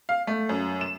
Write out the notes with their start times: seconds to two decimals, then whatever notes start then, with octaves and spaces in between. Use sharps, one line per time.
0.09 F5
0.27 A3
0.49 F#2
0.81 E7